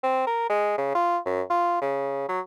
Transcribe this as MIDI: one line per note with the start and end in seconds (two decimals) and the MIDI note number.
0.03 0.25 60
0.27 0.49 70
0.50 0.73 56
0.78 0.92 49
0.95 1.18 65
1.26 1.42 42
1.50 1.79 65
1.82 2.26 49
2.29 2.40 54